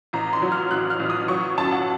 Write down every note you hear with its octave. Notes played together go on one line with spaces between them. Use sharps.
A1 A#5
C6
F#3
F6
A1 F#6
F6
A1
D#6
F#3 C#6
F#2 A5
F#5